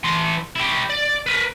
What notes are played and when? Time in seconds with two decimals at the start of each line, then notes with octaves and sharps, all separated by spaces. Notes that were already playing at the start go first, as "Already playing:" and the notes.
0.04 E3 C6
0.56 E4 G4
0.90 D5
1.26 A#4 B4